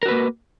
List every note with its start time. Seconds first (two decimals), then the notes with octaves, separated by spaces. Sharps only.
0.03 A#4
0.06 F#4
0.08 B4
0.11 A#3